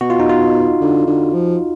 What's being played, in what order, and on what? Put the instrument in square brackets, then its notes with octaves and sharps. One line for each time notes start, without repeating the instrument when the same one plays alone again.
[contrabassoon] B2 [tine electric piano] F#4
[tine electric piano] F4
D#4
F4
[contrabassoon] D3
D3
F3